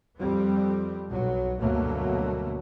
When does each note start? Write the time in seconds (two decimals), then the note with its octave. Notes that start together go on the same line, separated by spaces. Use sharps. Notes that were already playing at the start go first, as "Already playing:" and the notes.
0.19 F2 G3 C4
1.08 B1 F#3
1.60 D2 G2 B2 F#3 A3 A#3